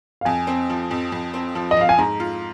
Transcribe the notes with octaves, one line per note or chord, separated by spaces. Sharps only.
F5
F2 G#5
C4
F3
F2
F2
C4
F3
D#5
F2 F5
G#5
G#2 A#5
F4